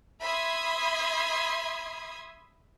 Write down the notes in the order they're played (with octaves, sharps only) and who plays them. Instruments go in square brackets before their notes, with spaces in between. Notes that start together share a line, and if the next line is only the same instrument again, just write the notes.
[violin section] E5 B5 C6 D#6 G#6